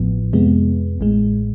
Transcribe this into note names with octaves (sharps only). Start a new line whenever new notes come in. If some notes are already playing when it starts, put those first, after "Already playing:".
Already playing: A1 A2 F3 B3
F2 C3 G#3 B3
A1 A2 G#3